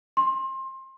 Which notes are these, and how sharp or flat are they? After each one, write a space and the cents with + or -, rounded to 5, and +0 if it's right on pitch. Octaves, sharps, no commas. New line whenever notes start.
C6 +25